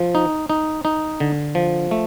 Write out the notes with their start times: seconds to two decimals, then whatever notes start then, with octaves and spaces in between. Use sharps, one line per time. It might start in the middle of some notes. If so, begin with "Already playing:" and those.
Already playing: F3
0.15 D#4
0.50 D#4
0.85 D#4
1.20 D3
1.55 F3
1.91 A3